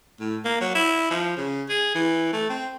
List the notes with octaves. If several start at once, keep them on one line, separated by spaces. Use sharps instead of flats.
A2
A#3
F#3
E4
F3
C#3
G#4
E3
A3
C4